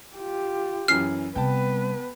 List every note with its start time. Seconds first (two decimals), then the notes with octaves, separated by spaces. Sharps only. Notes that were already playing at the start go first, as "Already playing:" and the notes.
0.16 F4 G4
0.88 F#2 E3 C#4 F6 C7
1.36 C3 G3 B3 B4 G5 A5